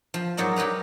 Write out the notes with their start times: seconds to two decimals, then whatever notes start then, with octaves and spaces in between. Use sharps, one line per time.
0.14 F3
0.37 G#2 F#3 D#4 A#4 D5
0.56 F#3 G4 A#4 B4 A#5